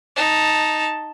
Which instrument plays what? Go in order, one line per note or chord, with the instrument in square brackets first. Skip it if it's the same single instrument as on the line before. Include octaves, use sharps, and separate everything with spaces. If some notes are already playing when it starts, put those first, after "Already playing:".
[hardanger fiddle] D#4 A5